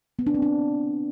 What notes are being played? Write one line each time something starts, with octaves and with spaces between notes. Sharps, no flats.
B3
D4
C4
D4